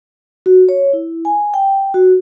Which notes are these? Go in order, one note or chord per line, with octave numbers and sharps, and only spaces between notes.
F#4
C#5
E4
G#5
G5
F#4